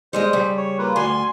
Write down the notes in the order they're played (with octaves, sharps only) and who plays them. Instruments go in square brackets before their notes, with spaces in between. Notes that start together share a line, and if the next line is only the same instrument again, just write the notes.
[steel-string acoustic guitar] G3 G#3 D#5 [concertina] C5
[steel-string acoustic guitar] C#3 G3
[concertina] C#5
A#3 F4 B4
[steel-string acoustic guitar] D2 [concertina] G#5 C6